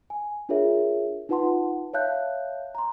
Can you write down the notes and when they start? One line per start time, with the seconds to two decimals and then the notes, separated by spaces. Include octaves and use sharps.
0.10 G#5
0.49 D4 F4 G#4 A#4 C#5 E5
1.29 D#4 F4 B4 F#5 A5 C6
1.94 C#5 E5 F5 A5 F#6 G6
2.75 A#5 C6